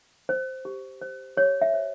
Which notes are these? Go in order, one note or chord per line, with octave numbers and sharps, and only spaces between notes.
C5
G4
C5
G4 C#5
E5
C5